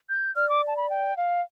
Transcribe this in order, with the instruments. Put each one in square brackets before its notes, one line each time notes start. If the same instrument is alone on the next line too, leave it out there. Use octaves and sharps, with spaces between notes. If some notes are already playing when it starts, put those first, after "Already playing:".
[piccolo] G6
[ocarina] D5 [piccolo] F6
[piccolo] D6
A5
B5
G5
F5